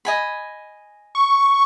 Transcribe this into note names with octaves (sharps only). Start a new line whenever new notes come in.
D#5 G#5 B5
C#6